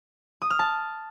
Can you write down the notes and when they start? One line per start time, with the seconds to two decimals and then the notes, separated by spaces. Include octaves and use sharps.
0.42 D#6
0.50 F6
0.59 A5